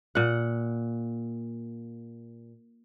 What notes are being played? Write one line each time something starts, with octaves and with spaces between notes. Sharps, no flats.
A#2 F#5